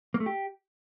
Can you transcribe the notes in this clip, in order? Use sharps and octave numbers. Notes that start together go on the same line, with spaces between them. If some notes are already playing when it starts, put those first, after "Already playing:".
A#3
A3
G4